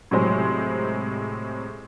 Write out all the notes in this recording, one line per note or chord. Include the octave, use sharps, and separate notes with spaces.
A2 C3 F#3 G#3 C5